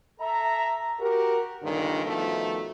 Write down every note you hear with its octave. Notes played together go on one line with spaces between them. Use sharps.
A4 E5 A#5
F#4 G4 A#4
C#2 G2 A#2 D3 D#3
C2 B2 D#3 F3 A3